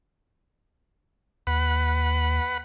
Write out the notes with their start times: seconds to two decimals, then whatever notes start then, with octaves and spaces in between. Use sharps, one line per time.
1.47 D#2 B4 F#5 B5